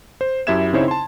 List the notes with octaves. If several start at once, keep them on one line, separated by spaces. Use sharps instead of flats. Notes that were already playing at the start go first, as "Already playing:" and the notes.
C5
F#2 E4 G4 E5 G#6 E7
C#3 C4 D#4 E4 C5 C#5
A5 C6